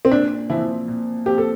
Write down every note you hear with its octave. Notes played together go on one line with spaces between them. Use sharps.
C4
A#2 D4
E3 F3 C4 E4
A#2
F3 C4 G4
A4